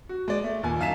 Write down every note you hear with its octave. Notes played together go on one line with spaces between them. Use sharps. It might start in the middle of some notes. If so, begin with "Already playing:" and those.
F#4
G#3 D5
A3
D#2 A#2 G#5
F#2 D#4 F5 A5 B6 E7